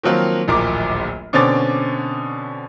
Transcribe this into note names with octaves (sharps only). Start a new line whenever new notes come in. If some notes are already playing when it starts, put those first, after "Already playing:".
D#3 F3 F#3 A#3 C4
D1 A#1 D#2 A#2 A#4 D6
B2 D3 C4 C#4 D6 A6